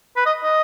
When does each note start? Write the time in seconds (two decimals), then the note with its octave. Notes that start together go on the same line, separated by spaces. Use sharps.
0.16 B4
0.26 D#5
0.43 D#5